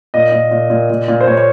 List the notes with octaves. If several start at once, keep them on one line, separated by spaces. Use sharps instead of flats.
A#2 D#5
A#2
A#2
A#2
A#2
A#2
C5
A#2 C#5
C#5